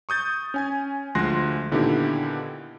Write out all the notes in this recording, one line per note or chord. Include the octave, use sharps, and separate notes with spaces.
C#6 D#6 G6 A6
C#4 G#5 G#6
D2 F3 G#3 C6 F#6 A#6
A#2 D3 D#3 B3 E4 G4